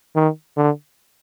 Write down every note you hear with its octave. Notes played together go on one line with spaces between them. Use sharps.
D#3
D3